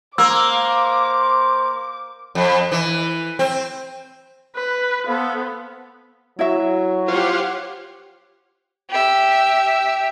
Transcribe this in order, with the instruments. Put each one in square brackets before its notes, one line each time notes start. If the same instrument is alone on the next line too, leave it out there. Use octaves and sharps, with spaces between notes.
[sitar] A#3 [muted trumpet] C5 [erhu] D6 [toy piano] E6
[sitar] F2
E3
C4
[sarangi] B4
[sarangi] B3 [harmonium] A4 C5 F5
[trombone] F#3 [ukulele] E4 F#4 E5
[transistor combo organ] F4 C5 [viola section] G4 C#5 F#5
[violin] G4 E5